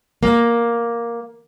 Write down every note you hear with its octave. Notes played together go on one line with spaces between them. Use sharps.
A#3